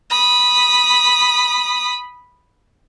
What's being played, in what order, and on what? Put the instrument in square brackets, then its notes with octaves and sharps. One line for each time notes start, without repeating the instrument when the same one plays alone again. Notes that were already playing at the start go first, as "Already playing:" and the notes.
[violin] B5 D#6